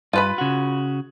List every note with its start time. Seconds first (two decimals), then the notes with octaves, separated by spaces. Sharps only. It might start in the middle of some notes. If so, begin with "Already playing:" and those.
0.13 G2 F4 B4 B5
0.38 C#3 F#4